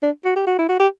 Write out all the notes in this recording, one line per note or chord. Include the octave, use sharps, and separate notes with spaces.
D4
F#4
G4
F#4
E4
F#4
G4